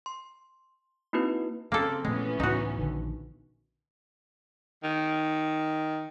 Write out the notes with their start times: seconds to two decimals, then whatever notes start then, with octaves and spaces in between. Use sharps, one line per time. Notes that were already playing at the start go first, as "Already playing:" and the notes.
0.06 C6
1.13 A#3 C4 D#4 E4 F#4 B4
1.72 C#3 A#3 C4 A4
2.05 A#2 E3 G#3 A3 B3 C#4
2.40 C#2 A2 D#4 F#4
2.78 A#1 D3 D#3
4.84 D#3